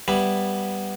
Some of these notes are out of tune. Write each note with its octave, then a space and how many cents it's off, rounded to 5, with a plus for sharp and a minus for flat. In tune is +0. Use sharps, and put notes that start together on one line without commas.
G3 +0 B3 +0 E4 +0